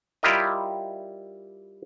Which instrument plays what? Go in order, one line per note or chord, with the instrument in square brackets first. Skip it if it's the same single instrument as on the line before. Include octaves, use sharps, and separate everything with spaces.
[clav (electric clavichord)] G3 E4 F4 G4 A#4 D#5